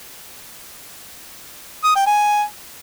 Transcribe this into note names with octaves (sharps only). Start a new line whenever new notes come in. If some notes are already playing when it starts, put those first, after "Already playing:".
D#6
G5
G#5